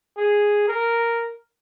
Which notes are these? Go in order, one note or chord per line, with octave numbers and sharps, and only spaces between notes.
G#4
A#4